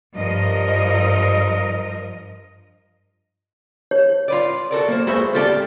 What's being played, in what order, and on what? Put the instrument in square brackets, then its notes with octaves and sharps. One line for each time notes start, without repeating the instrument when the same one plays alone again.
[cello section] G2 F3 A#4 D#5
[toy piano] C#5
[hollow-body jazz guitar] F4 B4 D5
F#4 A4 A#4 D5
A#3 C5
G#3 A#3 F#4 B4 C5 E5
C4 F4 G4 A4 D5